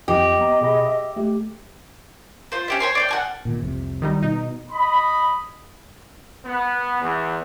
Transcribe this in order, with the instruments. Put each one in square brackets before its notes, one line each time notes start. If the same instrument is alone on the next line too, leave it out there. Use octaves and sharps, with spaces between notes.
[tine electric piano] F2 [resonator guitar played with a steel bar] G4 [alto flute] D#5
[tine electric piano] B3 A#5
B2 G#4 B5
E5
A3 G4
[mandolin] F4 C5
C#4 G4 E5
C5 C#5 C6
D5 F5 G5
F#5 G#5 F6
[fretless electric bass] A#2 D#3
C2 F2 C3
[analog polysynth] D#3 G3 D#4
[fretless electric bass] B2 [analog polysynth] D#4
[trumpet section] D#5 B5
[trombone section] B3
E2